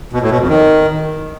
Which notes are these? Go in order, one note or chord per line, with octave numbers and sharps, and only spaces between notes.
B2
A2
B2
F2
D#3